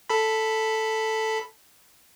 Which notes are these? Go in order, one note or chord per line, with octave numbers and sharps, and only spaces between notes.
A4 B5